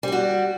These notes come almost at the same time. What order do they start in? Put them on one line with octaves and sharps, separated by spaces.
G3 G4 F#4